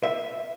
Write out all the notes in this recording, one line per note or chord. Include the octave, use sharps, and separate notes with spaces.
E5